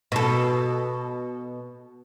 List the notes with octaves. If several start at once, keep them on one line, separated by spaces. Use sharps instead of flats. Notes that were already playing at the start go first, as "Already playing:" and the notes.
B2 A4